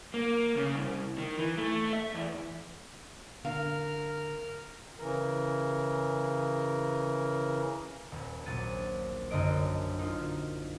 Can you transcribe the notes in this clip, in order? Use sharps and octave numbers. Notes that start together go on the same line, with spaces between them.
A#3
C#3
C2
D#3
E3
A3
E5
E2
D3 A#4 F5 F6
C#3 E3 A#4
D#1
A#1 F#3 A6 D#7
F#2 D3 D#4 D#5 D7
D#4 F4